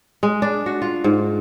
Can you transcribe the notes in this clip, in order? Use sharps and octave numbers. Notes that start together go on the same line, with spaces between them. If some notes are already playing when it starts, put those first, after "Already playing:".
G#3
D4
F#4
F4
G#2